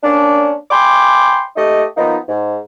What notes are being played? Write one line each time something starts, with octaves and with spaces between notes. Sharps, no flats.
A#3 C#4 D4
G5 G#5 B5 C6 D6
A3 D#4 G4 D#5
F3 A#3 B3 D#4
G#2